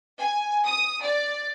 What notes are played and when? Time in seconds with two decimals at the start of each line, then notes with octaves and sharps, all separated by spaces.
0.19 G#5
0.66 D#6
1.02 D5